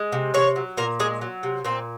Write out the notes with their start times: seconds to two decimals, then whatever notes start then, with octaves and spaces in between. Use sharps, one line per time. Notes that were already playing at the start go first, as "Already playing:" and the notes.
Already playing: G#3
0.12 C3
0.34 C3 C#5
0.56 F#3
0.77 A#2 A#4
1.00 G#3 G#4
1.21 F#3
1.43 C3
1.65 A#2 C4